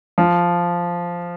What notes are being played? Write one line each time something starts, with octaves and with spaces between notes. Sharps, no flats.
F3